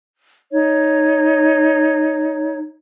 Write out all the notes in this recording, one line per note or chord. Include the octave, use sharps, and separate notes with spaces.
D#4 C#5